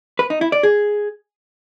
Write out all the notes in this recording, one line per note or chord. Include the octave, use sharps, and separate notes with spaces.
B4
D#4
E4
D5
G#4